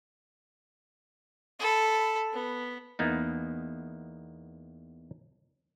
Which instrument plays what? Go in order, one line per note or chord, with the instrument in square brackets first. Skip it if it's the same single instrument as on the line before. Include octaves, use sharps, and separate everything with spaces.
[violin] A4 B5
B3
[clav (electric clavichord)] E2 A#3 B3 D#4